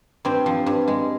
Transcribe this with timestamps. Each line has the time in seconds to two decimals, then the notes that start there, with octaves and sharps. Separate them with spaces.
0.25 G2 C4
0.46 F3
0.66 G2
0.88 G#3